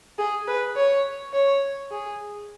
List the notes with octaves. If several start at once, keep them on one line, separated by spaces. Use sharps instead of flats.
G#4
B4
C#5
C#5
G#4